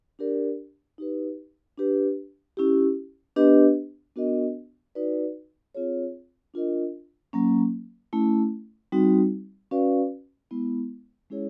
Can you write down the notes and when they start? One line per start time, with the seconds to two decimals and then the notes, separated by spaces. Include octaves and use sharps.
0.19 D4 G4 A#4 D5
0.98 D#4 G4 B4
1.78 D4 G4 B4
2.57 C#4 E4 G4
3.36 B3 D4 G4 B4 D#5
4.16 B3 D4 F#4 A#4 D#5
4.95 D#4 F#4 B4 D5
5.75 C4 F4 G#4 C#5
6.54 D4 F4 A#4 D#5
7.33 F#3 A#3 C#4
8.13 A3 C#4 E4
8.92 G3 C4 D#4 F#4
9.71 C#4 F#4 B4 D5 F5
10.51 G#3 B3 E4
11.30 G#3 C#4 E4 G#4 C#5